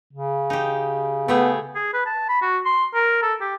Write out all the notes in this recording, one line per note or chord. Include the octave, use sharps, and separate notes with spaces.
C#3
D#4 G4
A3 B3 G4 G#4
G#4
B4
A5
B5
F#4
C6
A#4
A4
G4